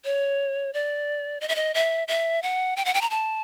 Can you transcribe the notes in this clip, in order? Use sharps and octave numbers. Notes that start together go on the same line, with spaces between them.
C#5
D5
D#5
E5
D#5
E5
E5
F#5
G5
F#5
G5
A#5
A5